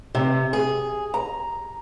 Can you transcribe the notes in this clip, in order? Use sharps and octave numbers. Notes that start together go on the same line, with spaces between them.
C3
G#4
A#5